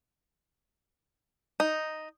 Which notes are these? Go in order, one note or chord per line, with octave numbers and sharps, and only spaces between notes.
D#4